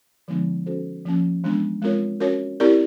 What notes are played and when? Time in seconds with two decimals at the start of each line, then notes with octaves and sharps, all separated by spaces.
0.28 D3 F3 G#3 B3 D#4
0.66 C#4 F#4 A4 C5
1.06 F3 A#3 C#4
1.44 E3 G#3 B3 D4
1.82 G#3 C4 F4 A#4 C#5
2.20 C#4 F#4 A#4 C#5
2.60 C4 E4 G4 A#4 D5